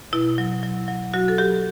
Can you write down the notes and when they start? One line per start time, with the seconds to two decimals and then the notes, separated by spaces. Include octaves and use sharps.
0.13 B2 E4
0.38 F#3
0.63 F#3
0.88 F#3
1.14 F#3 F#4
1.28 A4
1.38 F#3 G4